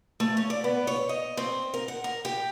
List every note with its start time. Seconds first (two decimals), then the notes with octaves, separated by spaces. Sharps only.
0.20 A3
0.37 C#4
0.50 D5
0.64 B3
0.87 C#5
1.09 D#5
1.37 C4
1.74 A#4
1.88 F#5
2.04 A#4
2.25 G4